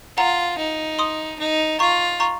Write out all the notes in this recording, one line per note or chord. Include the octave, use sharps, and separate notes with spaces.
F4 F#5 A#5
D#4
C6 D#6
D#4
F4 A#5 C#6
A#5 C#6